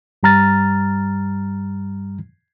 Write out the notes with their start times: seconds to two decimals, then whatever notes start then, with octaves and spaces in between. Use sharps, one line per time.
0.23 G2 G3 A#5 F6 A6